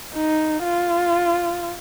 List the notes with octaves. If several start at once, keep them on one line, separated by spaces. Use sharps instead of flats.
D#4
F4